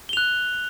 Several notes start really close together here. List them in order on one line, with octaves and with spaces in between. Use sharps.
G7 F7 F#6